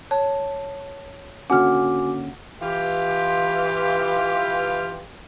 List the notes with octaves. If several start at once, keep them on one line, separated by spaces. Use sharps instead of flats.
C#5 A5
D3 A#3 C#4 F#4 F#5 G#5 D6 F6
E3 F4 G4